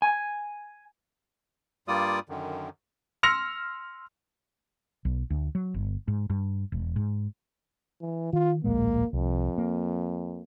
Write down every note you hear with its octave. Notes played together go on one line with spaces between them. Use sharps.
G#5
G2 G3 A#3 F4 D5 D#6
F#2 D3 D#3
C6 E6 F6 A#6 C#7 F7
B1
D2
F#3
G1
G#2
G2
E1
G#2
E3
D#3 F4
D1 A#1 G#3 A#3
C2 F2
A#3